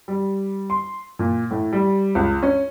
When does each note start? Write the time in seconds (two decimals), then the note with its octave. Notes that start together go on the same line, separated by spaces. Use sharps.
0.08 G3
0.70 C6
1.19 A#2
1.51 A2
1.73 G3
2.15 C#2
2.43 C#4